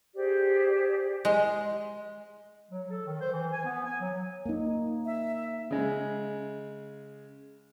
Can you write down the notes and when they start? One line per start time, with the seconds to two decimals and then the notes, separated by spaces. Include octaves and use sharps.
0.14 G4 G#4 C5 D5
1.25 G#3
2.71 F#3
2.90 A4
3.06 D#3
3.20 C5
3.32 E3
3.52 G#5
3.65 B3
3.85 G#5
4.00 F#3
4.46 A#3 D#4
5.06 E5
5.71 C#3 G#3